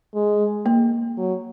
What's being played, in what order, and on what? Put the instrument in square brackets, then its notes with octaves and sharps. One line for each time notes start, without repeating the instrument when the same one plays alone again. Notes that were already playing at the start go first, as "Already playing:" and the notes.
[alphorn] G#3
[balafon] A#3
[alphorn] F#3